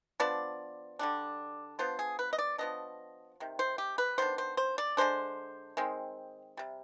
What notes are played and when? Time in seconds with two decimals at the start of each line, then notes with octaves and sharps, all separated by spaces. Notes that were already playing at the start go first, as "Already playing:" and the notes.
0.20 F3 B3 D4 D5
0.99 D3 G3 D4
1.79 F3 B3 D4 C5
1.99 G#4
2.19 B4
2.33 D#5
2.38 D5
2.58 F3 B3 D4 D#5
3.40 C3 D#3
3.59 C5
3.78 G4
3.98 B4
4.18 D#3 B3 D4 C5
4.38 C5
4.57 C5
4.78 D5
4.97 D3 G#3 D4 C5
5.77 D#3 G#3 C4
6.57 C3 G3